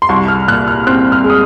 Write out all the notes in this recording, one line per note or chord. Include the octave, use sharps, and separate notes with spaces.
C6
C2 C#6
F6
A#2 F#6
F6
C4 F#6
F6
G#3
D#6